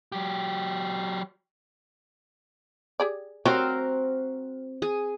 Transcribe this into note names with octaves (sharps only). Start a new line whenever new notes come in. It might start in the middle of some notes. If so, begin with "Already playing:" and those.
F#3 G4
G4 G#4 D5
G3 C4 F#4 G4 A#4 C#5 F5
G#4